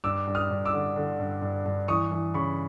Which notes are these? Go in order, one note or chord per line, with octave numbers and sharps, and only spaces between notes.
G2 D6 E6
G2
D#6 F6
G2
D6 E6
D3
D3
G2
G2
G2
E3 C#6 D#6
E3
C#3 B5 C#6